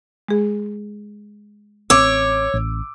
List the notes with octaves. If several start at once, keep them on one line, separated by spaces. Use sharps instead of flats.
G#3 G#4
A1 C4 C#5 D6 E6
A1